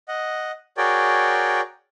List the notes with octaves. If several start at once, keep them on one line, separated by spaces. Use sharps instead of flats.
D#5 F#5
F#4 G#4 A#4 C#5 D5 G5